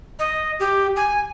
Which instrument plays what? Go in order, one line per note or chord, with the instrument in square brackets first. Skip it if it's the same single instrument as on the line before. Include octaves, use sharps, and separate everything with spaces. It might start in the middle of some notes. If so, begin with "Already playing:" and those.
[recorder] D#5
G4
G#5